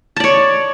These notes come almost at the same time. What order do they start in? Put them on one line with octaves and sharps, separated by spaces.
A5 D5 C#5